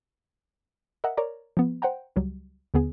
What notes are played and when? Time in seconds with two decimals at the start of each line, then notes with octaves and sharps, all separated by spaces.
1.04 A#4 D#5 E5 F#5
1.17 A#4 C#5 D5 A#5
1.57 F3 B3
1.82 C5 F#5 G5 A#5
2.16 C#2 F#3 G3
2.74 D#2 D3 B3 G#4